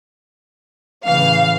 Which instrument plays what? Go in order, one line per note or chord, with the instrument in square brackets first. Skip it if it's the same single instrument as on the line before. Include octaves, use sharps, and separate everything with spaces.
[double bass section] A2 C#3 E3 [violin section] F5